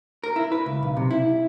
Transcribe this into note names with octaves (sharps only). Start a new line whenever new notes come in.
A#4
E4
B4
C#2
B1
C3
E4